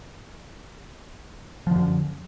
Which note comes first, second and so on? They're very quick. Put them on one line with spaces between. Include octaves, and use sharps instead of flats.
F3 D3 F#2